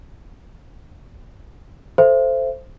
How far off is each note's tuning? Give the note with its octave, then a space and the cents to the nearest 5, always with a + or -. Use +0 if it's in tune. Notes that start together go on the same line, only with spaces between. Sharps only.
A4 +0 C5 +0 E5 +40